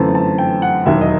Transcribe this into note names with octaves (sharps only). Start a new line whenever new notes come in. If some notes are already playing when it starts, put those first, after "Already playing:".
Already playing: G1 F#2 E3 A3 C4 A5
A5
G5
F#5
E1 D#2 D#3 F#3 E5
D#5